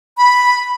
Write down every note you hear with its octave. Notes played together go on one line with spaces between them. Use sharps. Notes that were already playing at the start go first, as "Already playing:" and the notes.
B5